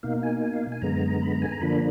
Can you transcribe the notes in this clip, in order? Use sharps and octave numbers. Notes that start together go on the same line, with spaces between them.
B2 A#3 D#4 F5
G#5
G#5
F5
G#5
F#2 D3 G#3 B3 A#5
B5
A#5
G#5
A#5
D3 F3 A#3 D4 B5